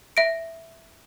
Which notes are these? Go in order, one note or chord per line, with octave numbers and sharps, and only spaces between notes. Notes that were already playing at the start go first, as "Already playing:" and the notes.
E5 A#6 D7